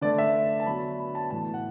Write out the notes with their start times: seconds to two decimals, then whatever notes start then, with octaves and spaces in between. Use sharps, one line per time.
0.01 D3 A3 D5
0.18 E5
0.60 A5
0.66 D3 F#3 B3 B5
0.99 B5
1.15 A5
1.31 A2 E3 B3 A5
1.54 F#5